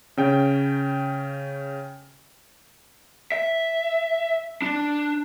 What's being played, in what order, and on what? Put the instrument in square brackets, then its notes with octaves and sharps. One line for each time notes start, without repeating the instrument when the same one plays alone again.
[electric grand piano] C#3 C#4 G5
[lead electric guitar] E5
D4